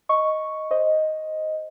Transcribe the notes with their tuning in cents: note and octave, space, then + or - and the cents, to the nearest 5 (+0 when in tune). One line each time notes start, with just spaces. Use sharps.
D#5 +5 C#6 +0
C5 +0 D#5 +5